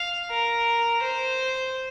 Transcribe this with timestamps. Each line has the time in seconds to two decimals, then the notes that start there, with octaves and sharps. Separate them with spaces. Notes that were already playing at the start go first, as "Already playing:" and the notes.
Already playing: F5
0.30 A#4
1.02 C5